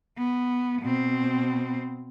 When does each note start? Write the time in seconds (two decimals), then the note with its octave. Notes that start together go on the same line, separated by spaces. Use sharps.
0.17 B3
0.82 B2 C4